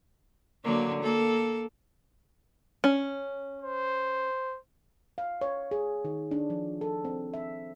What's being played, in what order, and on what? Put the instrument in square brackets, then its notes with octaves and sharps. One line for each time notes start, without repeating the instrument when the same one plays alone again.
[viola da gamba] D3 F#3 A#3
A#3 A4
[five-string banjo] C#4
[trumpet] C5
[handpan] F5
C#5
G#4
D#3
D4
F3
A4
C4
E5